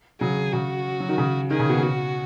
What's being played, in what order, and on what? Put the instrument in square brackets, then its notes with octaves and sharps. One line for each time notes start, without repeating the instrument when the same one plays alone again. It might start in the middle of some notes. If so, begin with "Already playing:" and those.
[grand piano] C#3 F#3 [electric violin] G#4
[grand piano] C#3 [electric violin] F#4
[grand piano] F#3
D#3
C#3
[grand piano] D#3 [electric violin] G#4
[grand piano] C#3
B2
[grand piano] C#3 [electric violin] F#4